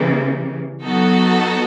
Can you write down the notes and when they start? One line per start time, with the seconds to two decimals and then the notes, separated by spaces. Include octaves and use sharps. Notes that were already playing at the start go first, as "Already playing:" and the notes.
Already playing: C#3 E3 G3 A#3
0.83 F#3 B3 D#4 F#4 A4